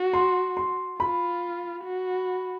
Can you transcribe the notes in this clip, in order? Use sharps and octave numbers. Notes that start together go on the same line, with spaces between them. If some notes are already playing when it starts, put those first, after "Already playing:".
Already playing: F#4
C6
C6
F4 B5
F#4